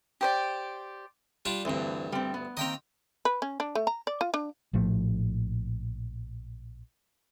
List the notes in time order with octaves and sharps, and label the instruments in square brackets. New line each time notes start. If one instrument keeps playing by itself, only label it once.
[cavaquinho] G4 C5 D5
[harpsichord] G3 D4 F4
[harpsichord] D2 G2 [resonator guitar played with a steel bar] D3 E3 C4
[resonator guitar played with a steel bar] G3 C4
B3
[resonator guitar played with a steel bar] D#3 A#3 C4 [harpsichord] D#5 G5 A#5
[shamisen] B4
C#4
D4
A3
A#5
D5
F4
D4
[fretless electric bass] A#1 A2 F3 A3